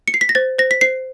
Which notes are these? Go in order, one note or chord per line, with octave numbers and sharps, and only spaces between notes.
C#7
C7
B6
A#6
C5 A6
C5 A#6
B6
C5 C7